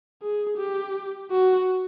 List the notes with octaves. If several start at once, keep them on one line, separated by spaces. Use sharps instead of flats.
G#4
G4
F#4